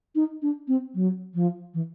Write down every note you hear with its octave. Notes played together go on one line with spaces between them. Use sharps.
D#4
D4
C4
F#3
F3
E3